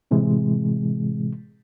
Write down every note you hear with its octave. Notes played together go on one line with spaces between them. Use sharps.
A2 C3 E3 G#3